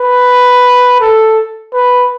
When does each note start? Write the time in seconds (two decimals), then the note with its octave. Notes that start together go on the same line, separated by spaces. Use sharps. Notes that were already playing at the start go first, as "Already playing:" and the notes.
Already playing: B4
1.00 A4
1.73 B4